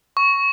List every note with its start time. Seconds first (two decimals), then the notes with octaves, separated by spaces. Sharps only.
0.17 C#6